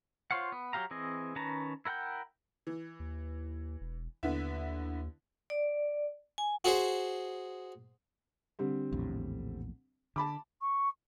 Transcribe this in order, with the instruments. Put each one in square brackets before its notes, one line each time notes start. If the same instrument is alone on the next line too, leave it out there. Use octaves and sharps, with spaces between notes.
[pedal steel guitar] F4 C5 C#5 F5 F#5
B3
F#3 F4 G4 F5 A#5
E3 C4 G#4 D#5
D#3 C#4 B4 A5 A#5
E4 A#4 F#5 G5 G6
[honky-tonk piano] E3
[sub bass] D#2
E1
[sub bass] D#2 [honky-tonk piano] D3 B3 E4
[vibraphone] D5
G#5
[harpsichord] F#4 G#4 C5
[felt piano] D3 G3 C4
[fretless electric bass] A#1 E2 A2
[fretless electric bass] D3 [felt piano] A5 B5 D6
[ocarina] C#6